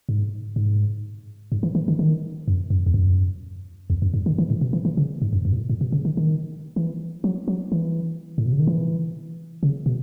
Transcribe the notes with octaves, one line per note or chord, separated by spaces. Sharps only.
G#2
G#2
G#2
E3
E3
D#3
D#3
F#2
F#2
E2
F#2
E2
F#2
G#2
D#3
E3
A2
B2
E3
E3
C#3
G#2
F#2
F#2
B2
A2
A2
B2
C#3
D#3
D#3
E3
F#3
F#3
E3
A2
B2
C#3
D#3
E3
C#3
B2